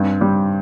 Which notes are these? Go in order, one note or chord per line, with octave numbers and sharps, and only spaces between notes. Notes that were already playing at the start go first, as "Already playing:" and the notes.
Already playing: G2 C4
G3